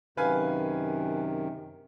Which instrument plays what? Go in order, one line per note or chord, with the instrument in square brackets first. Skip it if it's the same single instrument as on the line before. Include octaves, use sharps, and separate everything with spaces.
[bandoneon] F#2 C3 D#3 [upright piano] B4 F5 G#5